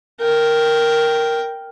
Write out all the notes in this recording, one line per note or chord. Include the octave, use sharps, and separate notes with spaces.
A#4 G5